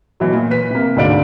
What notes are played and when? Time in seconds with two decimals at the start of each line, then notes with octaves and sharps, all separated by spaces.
0.20 B2 E3 F#3
0.33 A#2
0.50 B4 B6
0.71 C3 A#3
0.96 D2 G#2 D3 D5 F5 D7